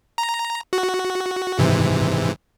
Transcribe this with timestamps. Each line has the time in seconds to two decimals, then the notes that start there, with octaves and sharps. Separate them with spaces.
0.18 A#5
0.73 F#4
1.59 G#2 C3 E3